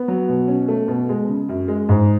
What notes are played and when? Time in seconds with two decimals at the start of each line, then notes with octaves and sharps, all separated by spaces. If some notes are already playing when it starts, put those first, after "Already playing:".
Already playing: B3
0.08 F#3
0.29 B2
0.48 C#4
0.68 A3
0.88 B2
1.09 G#3
1.28 C#3
1.49 F#2
1.68 G#3
1.89 G#2